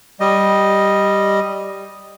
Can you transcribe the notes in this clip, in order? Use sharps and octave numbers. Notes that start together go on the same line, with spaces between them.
G3 D#5